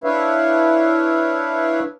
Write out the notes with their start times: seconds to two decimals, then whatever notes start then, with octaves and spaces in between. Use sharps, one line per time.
0.04 D4 E4 B4 C#5 E5 F5